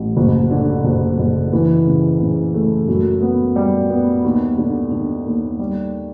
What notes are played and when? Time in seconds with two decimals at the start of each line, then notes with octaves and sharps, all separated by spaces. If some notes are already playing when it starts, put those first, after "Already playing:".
Already playing: A1
0.17 F#1
0.50 D3
0.84 F#1
1.18 F#1
1.53 E3
1.86 C#3
2.20 C#3
2.54 A3
2.88 F#2
3.22 B3
3.56 G3
3.90 B3
4.24 D#2
4.58 D3
4.91 D3
5.26 D#2
5.59 G3